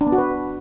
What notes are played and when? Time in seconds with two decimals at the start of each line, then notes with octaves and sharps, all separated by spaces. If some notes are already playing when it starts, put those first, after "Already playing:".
0.01 D4
0.07 B3
0.12 F#4
0.18 B4